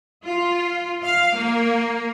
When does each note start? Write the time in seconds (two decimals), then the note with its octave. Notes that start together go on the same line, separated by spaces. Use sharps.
0.24 F4
1.04 F5
1.37 A#3